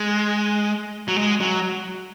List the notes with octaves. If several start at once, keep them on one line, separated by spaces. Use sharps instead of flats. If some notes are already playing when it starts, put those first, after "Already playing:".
Already playing: G#3
F#3
G#3
F#3